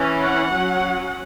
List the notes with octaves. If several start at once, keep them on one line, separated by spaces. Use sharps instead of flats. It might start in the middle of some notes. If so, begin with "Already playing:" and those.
Already playing: E3 C#4
F#5
F#3 C#4